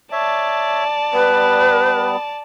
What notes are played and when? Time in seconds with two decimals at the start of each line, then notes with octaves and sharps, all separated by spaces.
0.12 C#5 D5 E5 A5
1.13 G3 B3 B4